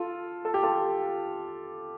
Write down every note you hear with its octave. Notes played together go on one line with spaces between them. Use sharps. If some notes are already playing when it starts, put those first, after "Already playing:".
Already playing: F4 A4
A4
G4
F4 A4